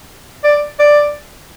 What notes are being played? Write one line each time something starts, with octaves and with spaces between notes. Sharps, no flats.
D5
D5